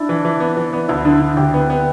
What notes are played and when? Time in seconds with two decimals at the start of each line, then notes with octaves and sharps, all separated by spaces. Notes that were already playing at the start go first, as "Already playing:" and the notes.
Already playing: D4 E4
0.09 E3
0.25 E3
0.40 B3
0.57 E3
0.73 B3
0.88 D2 E4
1.05 D3
1.21 D3
1.37 D2 G4
1.54 B3
1.70 B3